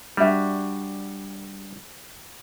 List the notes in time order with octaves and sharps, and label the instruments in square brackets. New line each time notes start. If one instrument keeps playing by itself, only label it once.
[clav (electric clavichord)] G3 [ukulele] D4 F#4 E5